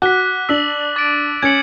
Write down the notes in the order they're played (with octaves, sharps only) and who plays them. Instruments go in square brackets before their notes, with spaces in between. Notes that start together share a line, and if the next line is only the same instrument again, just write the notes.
[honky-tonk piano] F#4 [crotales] D6 F#6 B6
[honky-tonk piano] D4 [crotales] E6 B6 F#7
[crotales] D6 A6 D7
[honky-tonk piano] C#4 [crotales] G#6 C#7 F#7